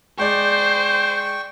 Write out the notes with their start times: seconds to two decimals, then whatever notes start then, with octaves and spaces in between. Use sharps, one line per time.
0.19 G#3 C5 D5 G5 C#6